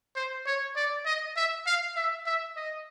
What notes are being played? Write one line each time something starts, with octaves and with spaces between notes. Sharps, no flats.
C5
C#5
D5
D#5
E5
F5
E5
E5
D#5